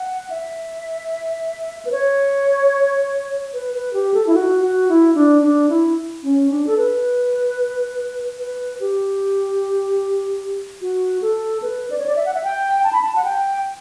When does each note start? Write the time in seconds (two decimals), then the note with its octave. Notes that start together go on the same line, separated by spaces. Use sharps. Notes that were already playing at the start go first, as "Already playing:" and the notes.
Already playing: F#5
0.30 E5
1.85 B4
1.92 C#5
3.53 B4
3.74 B4
3.93 G4
4.14 A4
4.27 E4
4.34 F#4
4.61 F#4
4.89 E4
5.15 D4
5.42 D4
5.69 E4
6.23 C#4
6.50 D4
6.67 A4
6.77 B4
8.38 B4
8.80 G4
10.82 F#4
11.22 A4
11.62 B4
11.90 D5
11.98 C#5
12.06 D5
12.16 E5
12.26 F#5
12.34 E5
12.44 G5
12.84 A5
12.93 B5
13.01 A5
13.16 F#5
13.25 G5